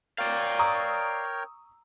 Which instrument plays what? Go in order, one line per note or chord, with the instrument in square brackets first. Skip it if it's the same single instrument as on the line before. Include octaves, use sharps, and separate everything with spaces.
[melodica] A#4 C#5 G5 [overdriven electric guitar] D5 F5
[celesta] A#5 [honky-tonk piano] C#6 D#6 E6